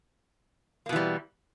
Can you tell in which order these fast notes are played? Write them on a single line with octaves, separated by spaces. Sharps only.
A#3 B2 E3 G3